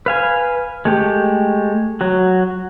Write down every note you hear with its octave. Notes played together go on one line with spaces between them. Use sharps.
B4 F5 G#5
G#3 A3 G4
F#3 F#4